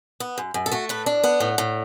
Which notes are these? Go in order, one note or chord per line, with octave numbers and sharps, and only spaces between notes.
B3
F#2
F#2
A4
A3 F#4
A2 B4
D4
B3 F#5
A2
A2